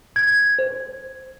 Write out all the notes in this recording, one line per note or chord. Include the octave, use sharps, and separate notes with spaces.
G#6
C5